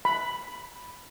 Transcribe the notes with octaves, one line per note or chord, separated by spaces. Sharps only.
B5